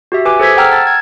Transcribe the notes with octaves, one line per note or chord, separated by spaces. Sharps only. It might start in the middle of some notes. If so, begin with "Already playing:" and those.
F#4 G4 E5
G4 B4 G#5 D6
G#4 A4 C5 E6 G#6 B6
F#5 G5 A#5 E6 F6
A5 A6
G#6